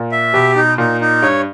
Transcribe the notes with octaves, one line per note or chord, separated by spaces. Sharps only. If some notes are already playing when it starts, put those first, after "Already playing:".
Already playing: A#2
E5
B2 G4
D#4
A#2 D#4
D#4
G2 C#5